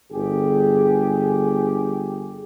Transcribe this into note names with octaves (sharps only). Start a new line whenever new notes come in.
G1 G4 G#4